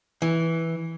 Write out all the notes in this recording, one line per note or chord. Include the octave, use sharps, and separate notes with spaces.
E3